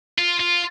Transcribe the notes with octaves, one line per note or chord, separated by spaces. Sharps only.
F4
F4